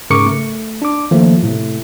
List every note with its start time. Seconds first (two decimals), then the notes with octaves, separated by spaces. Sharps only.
0.10 G#2 C#3 A#4 C#6 D6 C#7
0.26 A3
0.82 D4 D6
1.11 D#3 F3 A3 A#3
1.43 A2 C3 A3